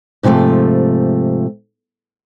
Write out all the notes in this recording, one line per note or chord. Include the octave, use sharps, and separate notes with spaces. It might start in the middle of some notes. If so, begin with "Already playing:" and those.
G#2 C3 F3 G#3 A3